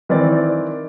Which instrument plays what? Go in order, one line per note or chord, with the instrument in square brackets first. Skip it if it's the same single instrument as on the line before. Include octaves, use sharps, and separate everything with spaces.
[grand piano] D#3 E3 C4 D5 A6